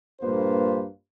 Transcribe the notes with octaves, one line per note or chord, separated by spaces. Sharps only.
A#1 G2 A#3 F4 B4 C5